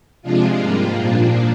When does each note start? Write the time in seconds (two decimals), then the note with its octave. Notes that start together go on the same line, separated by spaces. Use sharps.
0.22 C3 F3 G#3 D4 F4
0.59 G#2 G3 A#3 F4
0.95 A#2 F3 A#3 D4